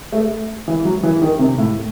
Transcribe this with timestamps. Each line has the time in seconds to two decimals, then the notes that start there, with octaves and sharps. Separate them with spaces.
0.12 A3
0.68 E3
0.85 F#3
1.03 E3
1.22 D#3
1.39 C3
1.58 A2